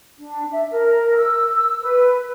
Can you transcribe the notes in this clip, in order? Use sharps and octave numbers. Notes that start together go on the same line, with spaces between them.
D4
E5
A#4
E6
B4